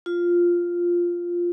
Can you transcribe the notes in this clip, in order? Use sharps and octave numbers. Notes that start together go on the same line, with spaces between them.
F4